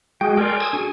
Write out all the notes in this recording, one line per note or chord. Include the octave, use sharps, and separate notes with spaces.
G#3 F#4 G#4 G5
A4 A#4 D5 G5 G#5 C6
D#6 E6 G#6
D4 F#4 G#4 G#5